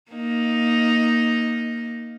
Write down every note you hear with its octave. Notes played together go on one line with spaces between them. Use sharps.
A#3 D#4